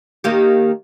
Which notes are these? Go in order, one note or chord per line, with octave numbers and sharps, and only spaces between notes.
D#3 A#3 G4